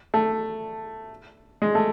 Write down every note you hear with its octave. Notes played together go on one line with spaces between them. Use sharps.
A3
G#3
A3